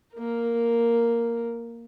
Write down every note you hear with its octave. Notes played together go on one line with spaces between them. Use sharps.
A#3 A#4